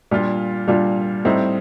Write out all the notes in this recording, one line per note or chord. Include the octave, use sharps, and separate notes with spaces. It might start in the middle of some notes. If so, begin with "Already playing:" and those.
A#2 G3 D4 F4
A#2 G3 D4 F4
A2 G3 C4 D#4